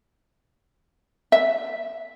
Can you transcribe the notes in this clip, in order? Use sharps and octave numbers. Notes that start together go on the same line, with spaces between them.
E5